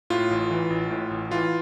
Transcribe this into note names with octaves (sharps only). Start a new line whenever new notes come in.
A2 F4
A1
E3
A1
A2
A1
E3 F4